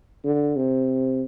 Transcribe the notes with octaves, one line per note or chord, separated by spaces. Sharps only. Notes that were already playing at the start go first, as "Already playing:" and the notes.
D3
C3